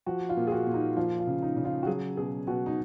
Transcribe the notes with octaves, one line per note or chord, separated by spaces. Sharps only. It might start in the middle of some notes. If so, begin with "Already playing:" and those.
F3 F#4
F4
A#2
G#4
F#4
A#2
D#4
F3 F4
F4
C#3
D#4
C#3
F4
F#4
F#3 G#4
B2 G#4
B2 F#4
D#4